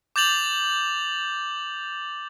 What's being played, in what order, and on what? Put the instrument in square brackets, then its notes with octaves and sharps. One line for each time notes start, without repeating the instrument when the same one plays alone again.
[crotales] D6 G6 A6 F7 F#7